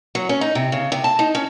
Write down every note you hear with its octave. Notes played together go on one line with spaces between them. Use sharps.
F#3
C#4
D#4
C3
C#3
C3
A5
D#4
C#4